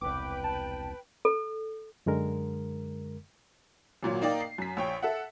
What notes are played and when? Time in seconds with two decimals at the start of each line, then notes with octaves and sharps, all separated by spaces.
0.01 E1 C2 B4 G5 D6
0.44 A5
1.25 A4
2.06 F#2 D3 G#3 A#4
4.03 G#1 A#2 F#3
4.22 A#3 D#4 D5 G5
4.40 C7
4.58 F#2 B6
4.77 A#1 C#5 G5
5.03 A4 E5 F#5